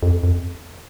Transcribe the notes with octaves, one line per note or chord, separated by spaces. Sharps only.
F2
F2